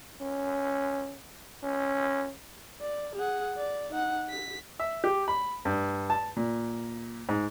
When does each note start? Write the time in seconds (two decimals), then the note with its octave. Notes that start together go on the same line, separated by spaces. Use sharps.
0.21 C#4
1.64 C#4
2.81 D5
3.15 G#4 F#5
3.57 D5
3.90 D#4 F#5
4.30 B6
4.80 E5
5.04 G4
5.28 B5
5.65 G2
6.10 A5
6.36 A#2
7.29 G#2